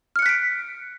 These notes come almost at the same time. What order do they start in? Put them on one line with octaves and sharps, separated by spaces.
F6 C#7 F#6 B6 D7